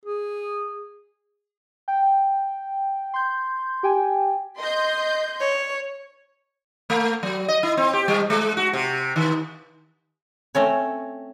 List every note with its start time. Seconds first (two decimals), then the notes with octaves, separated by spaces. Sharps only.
0.06 G#4
1.88 G5
3.14 C6 G6
3.83 G4 G5 G#5
4.58 D#5 C6 G6
5.39 C#5
6.90 A3
7.23 F#3
7.48 D#5
7.63 E4
7.77 C4
7.93 G4
8.08 G3
8.30 G#3
8.57 F#4
8.73 C3
9.16 D#3
10.55 A3 C4 C#4 C#5